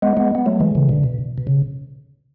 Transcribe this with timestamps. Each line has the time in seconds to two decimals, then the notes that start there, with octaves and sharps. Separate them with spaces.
0.02 G#3 B3
0.17 G#3 B3
0.35 B3
0.46 F#3 A3
0.60 E3 G#3
0.75 C#3 E3
0.89 B2 D3
1.03 B2
1.38 B2
1.47 C#3